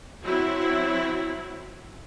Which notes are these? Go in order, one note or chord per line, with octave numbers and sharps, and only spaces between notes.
F#3 C4 E4